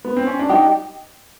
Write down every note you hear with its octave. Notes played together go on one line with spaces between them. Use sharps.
B3
C4
C#4
D4
D#4 G4